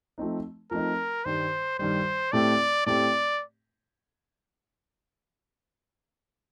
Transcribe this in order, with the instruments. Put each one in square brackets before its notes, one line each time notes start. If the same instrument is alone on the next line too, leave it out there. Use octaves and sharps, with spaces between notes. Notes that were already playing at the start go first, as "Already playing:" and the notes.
[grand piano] F3 A3 C4 D#4
[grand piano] F3 A3 C4 D#4 [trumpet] A#4
[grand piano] G2 D#3 G3 [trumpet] C5
[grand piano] G2 D#3 G3 [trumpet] C5
[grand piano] A2 A3 C4 G4 [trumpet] D5
[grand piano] A2 A3 C4 G4 [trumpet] D5